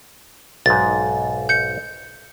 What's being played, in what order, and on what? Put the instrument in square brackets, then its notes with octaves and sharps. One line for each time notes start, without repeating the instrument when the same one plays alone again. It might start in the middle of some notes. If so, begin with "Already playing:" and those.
[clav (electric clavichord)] B1 G#2 [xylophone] A6
[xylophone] G6 C#7